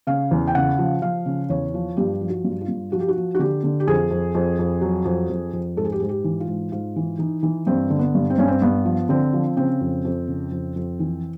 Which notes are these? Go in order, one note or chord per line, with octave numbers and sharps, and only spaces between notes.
C#3 F5
E2
G5
C#3 F#5
F3
F3 F5
C#3
E2 C#5
F3
G2 G4
F3
F#4
G2
F4
G2
F3 F#4
G4
F#4
F3
F#4
D3 G4
D3
G4
F2 G#4
F2
F2
F2
F#3
F2
F2
F2
G#2 A4
G#4
G4
G#2 G#4
G4
E3
F4
G#2
G#2 F4
E3
E3 D#4
E3
G2 C4
D3
B3
G2
C4
G2 C#4
C4
G2 B3
F3
D3 C4
F3
C#3 C4
F2
F2
C#3
F2
F2
E3